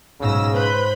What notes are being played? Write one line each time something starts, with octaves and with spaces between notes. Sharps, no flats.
B1 G#2 C#3 E6 A#6
B4 C5 B5 G6